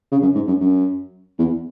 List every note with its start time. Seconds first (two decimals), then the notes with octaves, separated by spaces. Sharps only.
0.12 C#3
0.22 F#2
0.35 G#2
0.48 F#2
0.61 F#2
1.39 E2